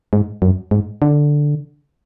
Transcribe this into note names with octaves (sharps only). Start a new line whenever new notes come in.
G#2
F#2
G#2
D3